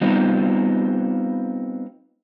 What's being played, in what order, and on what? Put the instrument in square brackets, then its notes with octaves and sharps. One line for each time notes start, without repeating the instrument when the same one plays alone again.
[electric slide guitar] G3 B3 C4 D#4 F4